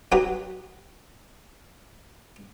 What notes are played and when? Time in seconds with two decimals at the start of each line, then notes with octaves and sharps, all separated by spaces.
0.12 F#3 D#4 F#4 G4 B4